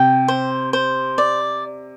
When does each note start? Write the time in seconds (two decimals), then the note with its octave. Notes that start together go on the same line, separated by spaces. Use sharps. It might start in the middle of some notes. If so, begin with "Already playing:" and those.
Already playing: C3 G5
0.28 C5
0.73 C5
1.18 D5